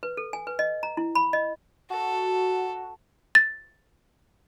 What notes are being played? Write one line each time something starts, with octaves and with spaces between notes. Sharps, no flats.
B4
A4
G#5
B4
D#5
A#5
E4
B5
D#5
F#4 A4
A6